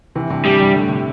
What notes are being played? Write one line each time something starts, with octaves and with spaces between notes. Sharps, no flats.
C3 E3
G2 C3
G2 G3
G2 C3
A2 D3
C3